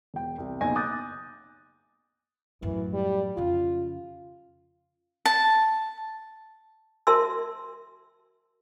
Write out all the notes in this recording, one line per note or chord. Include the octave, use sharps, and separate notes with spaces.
E1 G5
C2
F#1 B1 G#5 A#6
D6 D#6 F#6 G6 A6
F#2 A2 E3
G3
F2 C#3 F4
A5
F#4 A#4 E5 A5 C6 E6